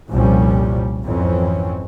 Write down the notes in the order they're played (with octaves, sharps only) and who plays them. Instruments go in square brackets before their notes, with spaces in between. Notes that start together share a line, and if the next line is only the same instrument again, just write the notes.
[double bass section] C2 F2 A#2 F3 G3 C#4
G#1 F2 E3 C4 C#4